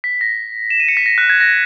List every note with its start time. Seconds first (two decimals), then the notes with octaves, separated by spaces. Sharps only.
0.04 B6
0.21 A#6
0.70 E7
0.80 D#7
0.88 C#7
0.97 B6
1.06 A#6
1.18 F#6
1.30 G#6
1.40 A#6